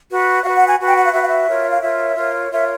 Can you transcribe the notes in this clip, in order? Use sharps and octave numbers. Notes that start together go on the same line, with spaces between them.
F#4 B4
F#4 B4 F5
F#5
G#5
F#4 B4
G5
F#5
F5
F#4 B4 E5
F5
E5
F4 A#4 C#5
F5
F4 A#4 C#5 E5
F4 A#4 C#5
F4 A#4 C#5 E5